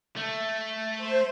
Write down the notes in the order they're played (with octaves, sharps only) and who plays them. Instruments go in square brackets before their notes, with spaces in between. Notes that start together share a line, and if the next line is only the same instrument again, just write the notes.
[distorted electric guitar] A3
[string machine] C5